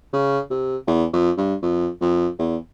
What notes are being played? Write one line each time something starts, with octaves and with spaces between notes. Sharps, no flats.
C#3
C3
E2
F2
G2
F2
F2
E2